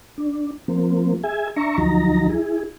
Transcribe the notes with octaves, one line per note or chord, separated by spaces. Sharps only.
D4
F3 A#3 C4
G#4 E5 G#5
D4 E5 A#5 C#6
D2 F3 F#3 D#4 A#5
E4 G#4